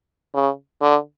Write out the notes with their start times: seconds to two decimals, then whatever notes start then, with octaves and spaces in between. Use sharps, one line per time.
0.34 C#3
0.81 D3